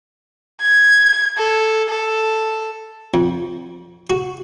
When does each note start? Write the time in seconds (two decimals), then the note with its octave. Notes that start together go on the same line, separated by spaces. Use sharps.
0.61 G#6
1.37 A4
1.89 A4
3.14 F2
4.10 F#4